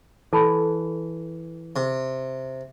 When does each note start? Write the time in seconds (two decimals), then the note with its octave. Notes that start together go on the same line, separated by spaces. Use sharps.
0.33 E3 A4 A5 B5
1.76 C3